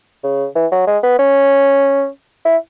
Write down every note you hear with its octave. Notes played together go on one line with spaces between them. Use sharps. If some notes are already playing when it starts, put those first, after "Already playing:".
C#3
E3
F#3
G#3
B3
C#4
E4